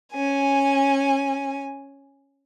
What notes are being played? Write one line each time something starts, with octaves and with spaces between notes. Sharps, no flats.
C#4 G#5